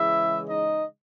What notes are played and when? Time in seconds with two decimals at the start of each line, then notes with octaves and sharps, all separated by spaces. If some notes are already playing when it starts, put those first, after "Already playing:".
Already playing: C#3 E3 G#3 E4 E5
0.49 D#4 D#5